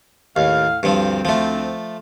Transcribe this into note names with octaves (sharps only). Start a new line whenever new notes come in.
D#2 A2 F5
D2 G2 F3 C4
F3 A3